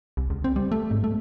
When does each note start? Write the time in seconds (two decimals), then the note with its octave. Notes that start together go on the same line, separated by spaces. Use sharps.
0.17 C2
0.30 C#2
0.44 C4
0.56 G3
0.72 A3
0.91 G#2
1.04 A3